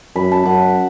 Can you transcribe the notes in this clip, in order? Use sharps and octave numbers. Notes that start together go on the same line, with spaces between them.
F#2 B5
A5
F#2 F#5